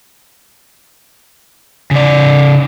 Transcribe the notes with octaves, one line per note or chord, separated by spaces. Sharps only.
C#3 D5